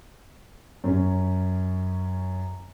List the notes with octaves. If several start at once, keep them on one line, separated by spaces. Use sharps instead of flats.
F#2 C#4